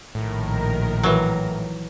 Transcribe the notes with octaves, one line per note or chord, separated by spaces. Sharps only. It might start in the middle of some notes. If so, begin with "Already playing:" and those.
A#1 A2 D#3 A#4
E3 F#3